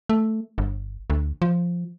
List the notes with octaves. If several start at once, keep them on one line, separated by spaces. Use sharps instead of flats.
A3
G1
D2
F3